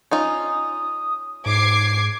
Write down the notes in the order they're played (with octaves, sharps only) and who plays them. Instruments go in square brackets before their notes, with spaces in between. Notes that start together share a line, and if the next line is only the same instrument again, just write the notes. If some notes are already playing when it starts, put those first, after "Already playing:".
[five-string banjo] C#4 D#4 F4 [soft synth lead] D#6
[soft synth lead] G#2 [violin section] D6 G#6 C7